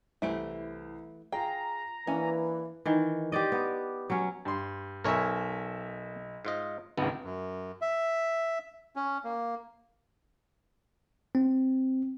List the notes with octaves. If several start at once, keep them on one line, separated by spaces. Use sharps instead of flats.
C2 E3 A3 E4 C5 D7
F4 G#4 G5 A#5
E3 A#3 C#4 D4 G#5
D#3 E3
G4 C5 D5 D#5
B3
F#3 C#4
G2 C6
B1 A#4 C#5 E5 G#5
G#2 F4 D#5
G#1 C#2 B3
F#2
E5
C#4
A#3
C4